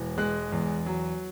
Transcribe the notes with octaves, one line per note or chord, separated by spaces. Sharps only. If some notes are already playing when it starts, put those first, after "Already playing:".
Already playing: E1 E3
G#3 F#6
E2
F#3